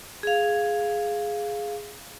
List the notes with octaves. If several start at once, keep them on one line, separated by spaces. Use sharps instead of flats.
G#4 F5